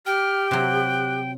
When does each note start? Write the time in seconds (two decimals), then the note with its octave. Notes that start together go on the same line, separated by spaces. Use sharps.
0.06 G4 G5 F6
0.51 C3 F#3 F#6